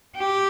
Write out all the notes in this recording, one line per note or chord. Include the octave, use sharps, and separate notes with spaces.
G4